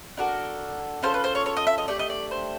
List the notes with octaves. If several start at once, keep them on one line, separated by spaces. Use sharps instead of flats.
D4 F#4 A4 A#4
C#4 F4 A4 C5
B4
C5
C#5
C#5
D#5
E5
D#5
A3 D4 G4 D5
D#5
D5
C5